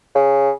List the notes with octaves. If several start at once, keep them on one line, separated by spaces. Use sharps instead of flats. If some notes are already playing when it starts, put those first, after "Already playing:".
C#3